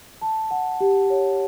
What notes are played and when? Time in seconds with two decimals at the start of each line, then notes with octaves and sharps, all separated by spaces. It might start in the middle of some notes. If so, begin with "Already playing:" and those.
0.22 A5
0.51 F#5
0.81 G4
1.10 C#5